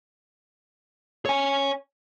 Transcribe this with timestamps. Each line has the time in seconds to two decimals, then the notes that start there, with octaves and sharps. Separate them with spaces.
1.25 C#5 G#5